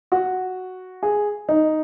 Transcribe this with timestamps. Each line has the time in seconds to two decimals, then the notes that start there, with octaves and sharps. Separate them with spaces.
0.12 F#4
1.03 G#4
1.49 D#4